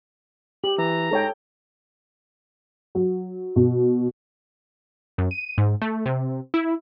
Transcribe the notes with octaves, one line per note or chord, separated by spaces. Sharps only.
G4 F#7
E3 A#5
G#2 A4 C#5 G5
F#3
B2
F#2
D#7
G#2
A3
C3
E4